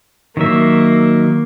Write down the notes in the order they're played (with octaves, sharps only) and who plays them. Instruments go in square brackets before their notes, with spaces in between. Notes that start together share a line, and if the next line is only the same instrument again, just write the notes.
[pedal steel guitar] D#3 F#3 E5 [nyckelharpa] A#3